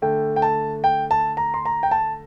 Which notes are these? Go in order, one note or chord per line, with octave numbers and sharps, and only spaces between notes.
D3 A3 G5
G5
A5
G5
A5
A#5
C6
A#5
G5
A5